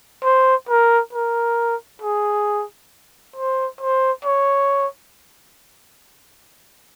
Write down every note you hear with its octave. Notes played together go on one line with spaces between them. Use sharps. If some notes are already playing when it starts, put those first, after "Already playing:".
C5
A#4
A#4
G#4
C5
C5
C#5